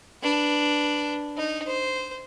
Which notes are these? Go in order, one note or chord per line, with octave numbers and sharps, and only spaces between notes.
D4 B4
D#4
C5